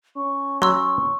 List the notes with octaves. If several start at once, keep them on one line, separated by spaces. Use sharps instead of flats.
C#4 C#6
F#3 C6 C#6 E6